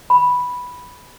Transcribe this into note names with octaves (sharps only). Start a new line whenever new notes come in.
B5